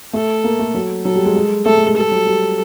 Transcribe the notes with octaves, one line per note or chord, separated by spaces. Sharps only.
A3 A4
A#3
A3
F#3
F#3 A4
G3
G#3
G#3
A3 A4
G#3
G#3
G3 A4
F#3
G3